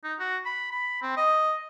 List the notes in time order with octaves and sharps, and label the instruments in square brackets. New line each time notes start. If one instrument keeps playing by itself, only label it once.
[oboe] D#4
F#4
B5
B5
C4
D#5